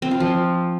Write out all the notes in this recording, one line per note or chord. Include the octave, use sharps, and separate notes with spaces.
C4
F4
F3